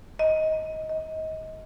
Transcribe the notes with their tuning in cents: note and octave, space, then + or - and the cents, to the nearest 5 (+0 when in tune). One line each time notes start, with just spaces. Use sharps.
D#5 +15
D#5 +25